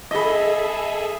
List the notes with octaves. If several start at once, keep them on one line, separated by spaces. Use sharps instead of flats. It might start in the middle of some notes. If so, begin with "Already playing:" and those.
G#4 A4 D#5 E5 B5